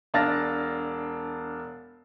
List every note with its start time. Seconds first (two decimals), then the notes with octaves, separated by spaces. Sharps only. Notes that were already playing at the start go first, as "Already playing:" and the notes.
0.14 E1 D4 F5 A5 A6 A#6